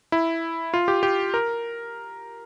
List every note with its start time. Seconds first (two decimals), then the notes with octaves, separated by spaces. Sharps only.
0.12 E4
0.74 F4
0.88 G4
1.03 G4
1.34 A#4